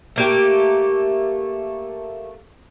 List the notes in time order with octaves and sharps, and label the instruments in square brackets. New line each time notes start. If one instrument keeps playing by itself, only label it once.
[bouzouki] A3 A#3 G4